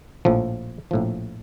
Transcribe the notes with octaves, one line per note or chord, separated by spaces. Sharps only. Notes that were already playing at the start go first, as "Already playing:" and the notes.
A#1 A2 F3
A#1 A2 F3